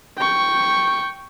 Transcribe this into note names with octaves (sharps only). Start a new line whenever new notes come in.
G5 C#6